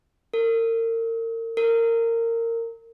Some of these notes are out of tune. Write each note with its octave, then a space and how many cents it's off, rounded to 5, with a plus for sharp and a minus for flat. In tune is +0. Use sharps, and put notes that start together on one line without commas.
A#4 -35
A#4 -20